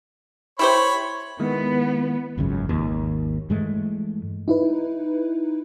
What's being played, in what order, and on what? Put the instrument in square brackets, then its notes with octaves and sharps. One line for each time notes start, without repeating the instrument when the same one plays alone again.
[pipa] E4 G4 C5 [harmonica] C#5 B5
[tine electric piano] D#3 G#3 E4 [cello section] B3
[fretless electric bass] G#1 C#2 F#2 C#3
G#1 D#2
G2 E3 G#3 A3
[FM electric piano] D#4 E4 B4